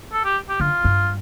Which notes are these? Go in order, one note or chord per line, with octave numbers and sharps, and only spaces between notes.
A4
G4
G4
D3 F4
G2